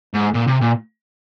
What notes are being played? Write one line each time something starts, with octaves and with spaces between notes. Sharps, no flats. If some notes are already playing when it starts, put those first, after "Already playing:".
G#2
A#2
C3
A#2